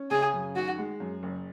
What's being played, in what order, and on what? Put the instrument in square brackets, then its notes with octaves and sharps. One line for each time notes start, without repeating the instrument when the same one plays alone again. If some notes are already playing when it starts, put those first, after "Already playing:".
Already playing: [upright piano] C#4
[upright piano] C#3 [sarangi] G#4
[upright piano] F#2
[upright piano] D#3 [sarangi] F#4
[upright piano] G#3
F#2
F#1